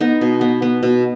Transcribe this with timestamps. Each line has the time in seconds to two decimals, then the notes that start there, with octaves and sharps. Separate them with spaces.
0.01 B3 D#4
0.21 B2
0.41 B3
0.62 B3
0.83 B2